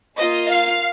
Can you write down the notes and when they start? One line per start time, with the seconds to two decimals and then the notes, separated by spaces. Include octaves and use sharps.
0.18 A#3 F4 D#5
0.50 F5